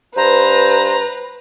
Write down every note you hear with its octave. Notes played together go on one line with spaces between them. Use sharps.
G2 B4 C5 A#5